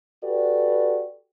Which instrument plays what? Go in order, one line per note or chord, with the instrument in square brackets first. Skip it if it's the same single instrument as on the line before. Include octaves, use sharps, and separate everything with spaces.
[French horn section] F#4 G4 A4 B4 D5